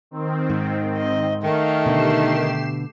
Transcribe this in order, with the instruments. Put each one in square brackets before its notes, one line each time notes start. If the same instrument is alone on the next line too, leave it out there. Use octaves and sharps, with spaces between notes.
[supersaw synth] D#3 C4
[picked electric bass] G#2
[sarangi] D#5
[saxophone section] D#3 [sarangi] A3 [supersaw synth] F5
[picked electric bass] B2 D3 [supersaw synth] G4 C7 E7